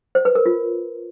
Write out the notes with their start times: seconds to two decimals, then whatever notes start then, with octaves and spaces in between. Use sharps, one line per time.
0.15 C5
0.25 B4
0.35 A#4
0.46 F4